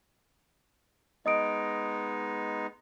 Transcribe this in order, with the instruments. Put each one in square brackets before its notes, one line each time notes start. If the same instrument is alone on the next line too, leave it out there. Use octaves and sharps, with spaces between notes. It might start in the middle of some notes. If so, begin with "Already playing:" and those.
[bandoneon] G#3 B3 D#4 [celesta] D#5 D#6 D7